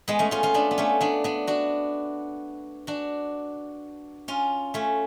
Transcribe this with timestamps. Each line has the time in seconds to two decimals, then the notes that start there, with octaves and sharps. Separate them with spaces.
0.08 G#3 B3
0.19 A3 C#4
0.31 C#4 F4
0.43 C#4 F4
0.54 B3 D4
0.71 B3
0.78 A3 C#4
1.01 B3 D4
1.24 B3 D4
1.47 D4 F#4
2.87 D4 F#4
4.28 C#4 F4
4.74 A3 C#4